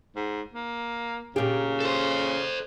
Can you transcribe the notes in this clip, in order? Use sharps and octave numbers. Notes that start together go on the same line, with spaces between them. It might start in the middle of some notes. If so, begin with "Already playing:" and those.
G#2
A#3
A#2 C#3 G4
A4 C5